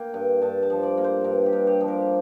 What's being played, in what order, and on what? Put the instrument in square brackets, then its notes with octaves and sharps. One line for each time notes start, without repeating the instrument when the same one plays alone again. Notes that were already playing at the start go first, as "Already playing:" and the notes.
Already playing: [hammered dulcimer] A#3 G5
G2
G2 A5
A5
F3
D5
A#3
C5
G2 A#4
G4
G2
G4
F3
A#4